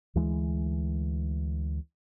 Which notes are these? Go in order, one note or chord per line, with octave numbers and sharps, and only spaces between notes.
D2 E3 G#3